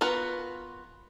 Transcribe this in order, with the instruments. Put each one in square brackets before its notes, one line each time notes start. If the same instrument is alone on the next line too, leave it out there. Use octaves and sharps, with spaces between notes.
[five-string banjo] B3 F4 F#4 A#4 B4